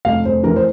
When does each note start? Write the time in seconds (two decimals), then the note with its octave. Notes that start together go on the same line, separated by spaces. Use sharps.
0.05 F1 F5
0.25 F1 C5
0.43 E3 A#4
0.56 C5